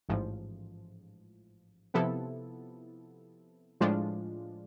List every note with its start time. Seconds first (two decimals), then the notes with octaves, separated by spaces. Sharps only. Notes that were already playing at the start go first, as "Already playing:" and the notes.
0.09 A1 G#2 F3
1.94 C3 F3 B3 E4 A4
3.81 A2 F3 G#3 D4 F4